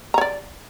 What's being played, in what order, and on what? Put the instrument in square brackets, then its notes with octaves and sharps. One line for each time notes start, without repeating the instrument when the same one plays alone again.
[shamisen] A#5
C#5
D5